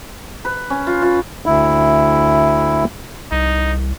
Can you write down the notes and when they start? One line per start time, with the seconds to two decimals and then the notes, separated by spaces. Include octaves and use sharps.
0.45 B4
0.70 C#4
0.87 F4
1.02 F4
1.46 D2 E4
3.32 C2 D#4